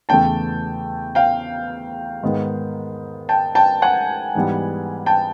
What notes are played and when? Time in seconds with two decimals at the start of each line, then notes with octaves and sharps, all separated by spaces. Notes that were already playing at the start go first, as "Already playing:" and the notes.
0.09 E2 C#3 E3 A3 G5 A5
1.15 F5 G5
2.23 G#2 D#3 G#3 B3
3.29 G5 A5
3.55 G5 A5
3.82 F#5 G#5
4.35 G#2 E3 G3 B3
5.06 G5 A5